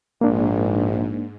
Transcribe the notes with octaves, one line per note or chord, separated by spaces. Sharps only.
A#1 G#2 A#3 D4